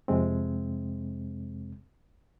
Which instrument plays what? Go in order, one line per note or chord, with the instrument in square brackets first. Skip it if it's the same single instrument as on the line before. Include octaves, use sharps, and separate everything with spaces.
[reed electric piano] F2 C3 G#3 C4